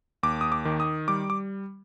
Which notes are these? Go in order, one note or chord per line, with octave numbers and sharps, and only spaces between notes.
D#2 D6
D#6
D6
D#3
D#6
G3 D6
D6